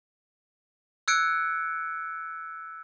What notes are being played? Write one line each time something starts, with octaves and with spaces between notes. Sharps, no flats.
E6 F#6 G#6 C#7 D7